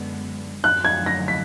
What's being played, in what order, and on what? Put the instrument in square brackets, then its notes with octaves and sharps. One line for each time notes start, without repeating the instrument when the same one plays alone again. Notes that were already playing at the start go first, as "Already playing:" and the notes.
Already playing: [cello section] F#2 D3 G#3 B3
[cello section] F#2 D3 F#3 [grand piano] F#6
[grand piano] G#6
A#6
B6